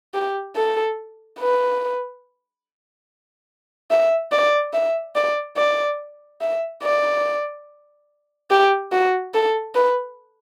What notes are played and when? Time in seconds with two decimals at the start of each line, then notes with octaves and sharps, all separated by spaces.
0.14 G4
0.56 A4
1.39 B4
3.90 E5
4.32 D5
4.73 E5
5.16 D5
5.57 D5
6.41 E5
6.83 D5
8.50 G4
8.92 F#4
9.34 A4
9.75 B4